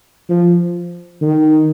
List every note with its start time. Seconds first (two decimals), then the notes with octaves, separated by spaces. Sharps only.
0.29 F3
1.21 D#3